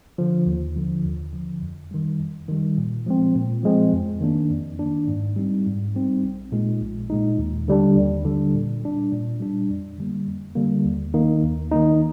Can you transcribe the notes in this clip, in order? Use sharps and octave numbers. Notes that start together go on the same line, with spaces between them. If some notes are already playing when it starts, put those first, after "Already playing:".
D3 F3
D#2
D3 F3
D#2
D3 F3
F2
D#3 G3
F2
D#3 G3
A#2
F3 G#3 C4
A#2
F3 G#3 C4
F2
D#3 A#3 D4
F2
D#3 A#3 D4
G#2
G3 C4 D#4
G#2
G3 C4 D#4
A#1
A#2 G#3 D#4
A#1
A#2 G#3 D#4
D#2
D3 G3 D4
D#2
D3 G3 D4
A#2
G3 D4
A#2
G3 D4
F2
D3 G3 A#3
F2
D3 G3 A#3
D#2
D#3 A#3 D#4
D#2
D#3 A#3 D#4